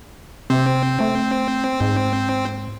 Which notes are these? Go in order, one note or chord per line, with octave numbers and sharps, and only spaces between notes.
C3 C4
A3
G#2